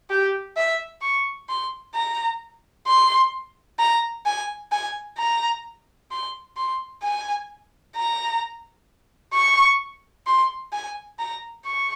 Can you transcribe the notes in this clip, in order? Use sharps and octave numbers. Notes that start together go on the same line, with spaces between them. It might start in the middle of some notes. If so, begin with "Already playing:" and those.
G4
E5
C#6
C6
A#5
C6
A#5
G#5
G#5
A#5
C6
C6
G#5
A#5
C#6
C6
G#5
A#5
C#6